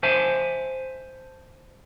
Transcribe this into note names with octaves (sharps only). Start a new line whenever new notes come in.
C5 E5 G#5 A5